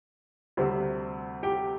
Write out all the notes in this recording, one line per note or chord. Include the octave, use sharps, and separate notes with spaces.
D2 C3 G3 C4
G4 G5